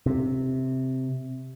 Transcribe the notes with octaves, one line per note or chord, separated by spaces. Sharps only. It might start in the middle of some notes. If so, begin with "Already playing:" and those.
C3